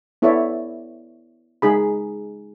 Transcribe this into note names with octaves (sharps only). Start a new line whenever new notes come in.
B3 E4 A4 C#5 D5 E5
G#3 D#4 G#4 B5